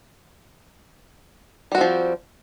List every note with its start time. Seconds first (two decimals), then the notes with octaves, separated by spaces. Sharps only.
1.72 G3
1.75 F#4
1.78 C4
1.81 F3